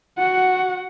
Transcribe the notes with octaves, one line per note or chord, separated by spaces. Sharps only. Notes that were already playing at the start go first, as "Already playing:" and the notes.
F#4 F#5